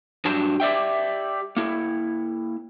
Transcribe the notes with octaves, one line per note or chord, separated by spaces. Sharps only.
G2 F#3 D4 F#4 G4 A5
G4 D5 E5 G5
A#3 E4